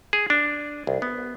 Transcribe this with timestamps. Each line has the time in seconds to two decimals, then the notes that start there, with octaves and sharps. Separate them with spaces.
0.13 G#4
0.30 D4
0.87 C2
1.02 B3